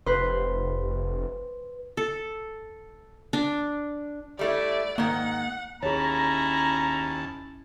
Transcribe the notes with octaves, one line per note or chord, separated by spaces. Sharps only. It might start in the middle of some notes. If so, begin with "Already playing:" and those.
F1 B4 C5
A4
D4
G3 A3 E4 D5
G#2 D#3 A#3 F#5
D#2 C#4 E4 G#4 C#5 A5 A#5